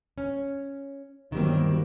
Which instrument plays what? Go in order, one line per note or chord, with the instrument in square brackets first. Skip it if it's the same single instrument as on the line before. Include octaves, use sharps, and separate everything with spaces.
[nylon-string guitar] C#4
[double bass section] G1 F#3 A#3 [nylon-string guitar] D#3 G3 C4